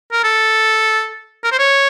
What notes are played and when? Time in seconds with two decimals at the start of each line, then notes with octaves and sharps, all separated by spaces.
0.12 A#4
0.24 A4
1.44 A#4
1.52 C5
1.59 C#5